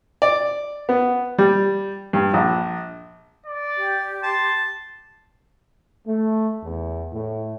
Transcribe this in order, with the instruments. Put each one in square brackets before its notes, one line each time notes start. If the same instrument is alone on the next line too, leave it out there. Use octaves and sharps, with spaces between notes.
[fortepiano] D5
B3
G3
G2
A#1
[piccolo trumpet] D5
[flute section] G4
[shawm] A5 [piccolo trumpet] C6
[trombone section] A3
E2
A2